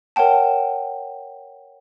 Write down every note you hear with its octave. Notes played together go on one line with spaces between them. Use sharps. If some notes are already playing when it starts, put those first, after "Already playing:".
A#4 C#5 F#5 G5 A5